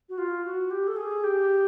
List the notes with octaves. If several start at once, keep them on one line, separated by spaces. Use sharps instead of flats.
F#4
F4
F#4
G4
A4
G#4
G4